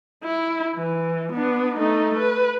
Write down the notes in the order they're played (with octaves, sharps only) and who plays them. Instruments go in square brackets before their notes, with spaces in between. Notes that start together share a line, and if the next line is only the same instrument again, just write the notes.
[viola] E4
E3
B3 D4
A3 D#4
B4